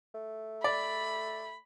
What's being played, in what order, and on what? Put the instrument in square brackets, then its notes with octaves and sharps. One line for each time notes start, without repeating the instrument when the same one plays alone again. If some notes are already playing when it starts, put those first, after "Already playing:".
[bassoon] A3
[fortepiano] D5 [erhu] B5